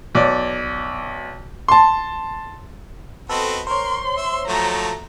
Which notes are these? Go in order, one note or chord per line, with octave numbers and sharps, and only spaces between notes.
B1 D5
A5 C6
B3 C4 F#4 A4 D#5
A#4 C5 C#5 C6
E5
F3 F#3 A3 A#5